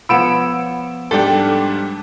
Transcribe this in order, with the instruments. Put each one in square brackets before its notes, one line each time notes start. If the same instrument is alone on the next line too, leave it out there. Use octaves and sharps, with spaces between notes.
[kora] F3 B3 C#5 [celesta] F#5 B5 [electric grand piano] E6 D7 E7
[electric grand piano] G#2 G3 D4 [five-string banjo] A4 G5